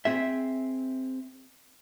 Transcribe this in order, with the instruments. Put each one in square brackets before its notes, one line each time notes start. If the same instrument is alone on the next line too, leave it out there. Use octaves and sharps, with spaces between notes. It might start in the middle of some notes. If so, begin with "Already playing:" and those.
[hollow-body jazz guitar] C4 G#4 E5